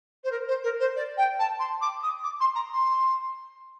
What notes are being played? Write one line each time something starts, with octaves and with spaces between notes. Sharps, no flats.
C5
A#4
C5
A#4
C5
D5
G5
A5
C6
D6
D#6
D6
C6
A#5
C6